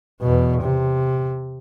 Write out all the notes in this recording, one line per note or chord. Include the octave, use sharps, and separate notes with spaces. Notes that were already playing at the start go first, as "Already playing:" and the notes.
E2 B2
C3